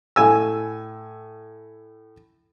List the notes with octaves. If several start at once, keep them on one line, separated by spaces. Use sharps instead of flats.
A2 G#5 E6